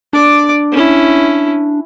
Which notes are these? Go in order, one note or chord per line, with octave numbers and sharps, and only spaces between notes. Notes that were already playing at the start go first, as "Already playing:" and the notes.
D4 D5 D6
C#4 E4